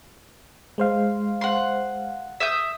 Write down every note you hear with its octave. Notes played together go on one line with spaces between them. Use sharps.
G#3 C5 F5
F#5 C6
E5 D#6 G6